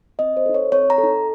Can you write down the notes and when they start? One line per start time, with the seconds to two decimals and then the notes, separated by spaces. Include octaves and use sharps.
0.19 C4 D#5
0.37 C5
0.46 D#4 A4
0.54 C#5
0.72 C4 C#5
0.90 A#5
0.98 A4
1.04 D#4